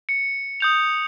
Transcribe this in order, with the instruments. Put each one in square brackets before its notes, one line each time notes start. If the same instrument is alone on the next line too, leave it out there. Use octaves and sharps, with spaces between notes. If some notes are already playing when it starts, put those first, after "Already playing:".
[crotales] C#7
D#6 G6 F7